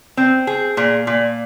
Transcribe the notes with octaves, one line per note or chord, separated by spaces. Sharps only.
C4
G#4
A#2
A#2